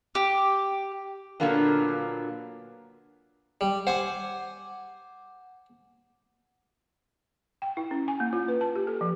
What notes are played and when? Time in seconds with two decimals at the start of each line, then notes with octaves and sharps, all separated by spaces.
0.15 G4
1.40 A#2 D3 F#3 A#3 B3 D4
3.61 G3
3.87 C5 F#5 G#5 D6
7.62 G5
7.77 E4
7.91 C#4
8.08 G#5
8.20 A#3
8.33 F4
8.48 B4
8.61 A5
8.75 G4
8.87 A4
9.01 F3